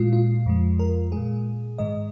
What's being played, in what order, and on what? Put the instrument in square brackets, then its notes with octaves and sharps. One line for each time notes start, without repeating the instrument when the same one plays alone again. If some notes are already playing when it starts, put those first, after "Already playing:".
Already playing: [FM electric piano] A#2 G#3 F4
F4
F2 F3 G#3
A#4
A#2 G#3 G#4
G#2 D#3 G#3 D#5